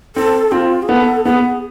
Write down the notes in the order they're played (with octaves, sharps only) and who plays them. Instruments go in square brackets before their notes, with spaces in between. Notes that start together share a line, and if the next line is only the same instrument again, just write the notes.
[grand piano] C4 [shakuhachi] A4
[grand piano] C4 [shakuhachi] F4
[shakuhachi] G#4
[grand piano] B3 [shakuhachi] A4
[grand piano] B3 [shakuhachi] G#4